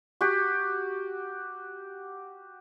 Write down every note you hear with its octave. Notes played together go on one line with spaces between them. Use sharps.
F#4 G4